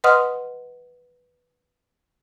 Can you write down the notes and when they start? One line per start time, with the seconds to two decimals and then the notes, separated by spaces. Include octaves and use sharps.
0.04 B4 D#5 F#5 C6 D#6 F6